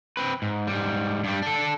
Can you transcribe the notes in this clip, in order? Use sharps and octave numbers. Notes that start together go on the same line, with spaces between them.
C4 B4
G#2
G#2 G3
G2 G3
D4 A4